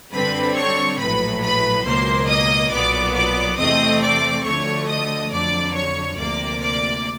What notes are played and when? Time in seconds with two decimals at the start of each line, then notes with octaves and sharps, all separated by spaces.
0.12 F#2 D3 G3 C4 B4 B5
0.55 C#5 C#6
0.98 A#1 A2 F#3 B4 B5
1.42 B4 B5
1.85 C#2 B2 F#3 A#3 C5 C6
2.28 D#5 D#6
2.71 B1 A#2 F#3 B3 D5 D6
3.15 D5 D6
3.58 E2 C3 E3 A3 C4 D#5 D#6
4.01 D5 D6
4.44 D2 D3 F3 A3 C#5 C#6
4.87 D#5 D#6
5.31 F2 D3 F#3 D5 D6
5.74 C#5 C#6
6.17 D2 C3 F3 A#3 D5 D6
6.60 D5 D6